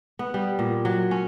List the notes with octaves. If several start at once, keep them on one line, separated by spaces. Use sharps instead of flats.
B3
G3
A#2
F#3
C#4